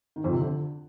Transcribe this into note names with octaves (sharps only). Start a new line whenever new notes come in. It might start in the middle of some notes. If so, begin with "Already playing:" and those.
D#3
F2
C3
D3